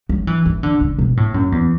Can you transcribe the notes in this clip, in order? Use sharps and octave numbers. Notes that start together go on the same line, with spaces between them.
F#3
E3
E3
D3
C#3
B2
A2
F#2
E2